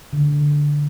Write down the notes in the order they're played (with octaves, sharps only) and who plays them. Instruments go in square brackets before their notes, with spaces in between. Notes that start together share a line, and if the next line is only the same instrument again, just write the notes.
[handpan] D3